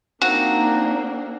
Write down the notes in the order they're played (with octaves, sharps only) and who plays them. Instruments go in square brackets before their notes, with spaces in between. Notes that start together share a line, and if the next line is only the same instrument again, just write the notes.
[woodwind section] F3 C4 D#4 [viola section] A#3 D4 [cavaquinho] F#4